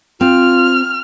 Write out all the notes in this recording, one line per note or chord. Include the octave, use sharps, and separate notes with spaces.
C4 F4 F6